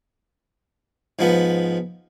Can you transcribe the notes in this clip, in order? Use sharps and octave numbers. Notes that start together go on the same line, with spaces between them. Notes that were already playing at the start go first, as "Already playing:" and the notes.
G#2 F3 B3